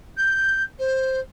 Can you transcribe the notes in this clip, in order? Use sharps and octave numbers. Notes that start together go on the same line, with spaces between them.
G6
C5